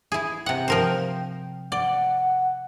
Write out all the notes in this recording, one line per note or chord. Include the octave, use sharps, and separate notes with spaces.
E4 G#4
C3 F#5 G5
F3 A#4 C5
D5 F#5